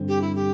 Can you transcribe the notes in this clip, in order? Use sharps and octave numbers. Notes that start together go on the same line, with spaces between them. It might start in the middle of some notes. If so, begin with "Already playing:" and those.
Already playing: G2 D3 C4
G4
E4
G4